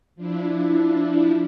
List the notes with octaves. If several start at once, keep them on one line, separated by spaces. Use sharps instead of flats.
F3 D4 E4